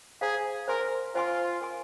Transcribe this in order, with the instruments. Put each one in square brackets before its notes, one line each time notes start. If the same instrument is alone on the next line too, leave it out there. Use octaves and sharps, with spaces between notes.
[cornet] G#4 [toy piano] C5 F5 A#5
[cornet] A#4 [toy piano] C5 G#5 C6
[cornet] F4 [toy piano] C5 G#5 C6
[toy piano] A#4 G#5 C6